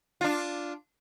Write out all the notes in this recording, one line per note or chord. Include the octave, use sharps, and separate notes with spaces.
D4 F4